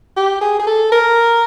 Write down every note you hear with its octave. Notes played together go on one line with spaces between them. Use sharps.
G4
G#4
G#4
A4
A#4